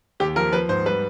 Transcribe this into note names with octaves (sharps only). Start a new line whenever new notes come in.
D#2 G4
F3 A#4
F3 B4
G#2 C5
G3 B4